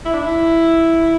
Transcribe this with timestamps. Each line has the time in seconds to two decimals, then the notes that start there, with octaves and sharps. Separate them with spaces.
0.05 E4
0.13 D4
0.22 E4